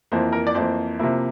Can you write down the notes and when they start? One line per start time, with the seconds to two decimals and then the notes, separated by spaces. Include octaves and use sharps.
0.12 F2 E3 A#3 C5
0.33 A#4
0.47 D5
0.54 F2 E3 A#3 C5
0.99 C3 F3 A#3 E4